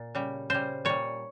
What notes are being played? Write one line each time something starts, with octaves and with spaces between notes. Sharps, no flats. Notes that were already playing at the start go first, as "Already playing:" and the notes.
Already playing: A#2
C#3 G3
C#3 G3 C5
A#2 G3 C#5